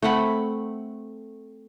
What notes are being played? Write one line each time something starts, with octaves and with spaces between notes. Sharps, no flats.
A3 C4 F#5 B5